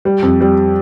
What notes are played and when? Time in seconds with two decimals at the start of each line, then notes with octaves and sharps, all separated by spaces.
0.05 G3
0.22 F2
0.41 G3